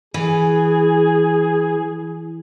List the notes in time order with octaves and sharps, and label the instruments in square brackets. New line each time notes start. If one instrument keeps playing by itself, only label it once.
[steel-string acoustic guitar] E3 [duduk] G#4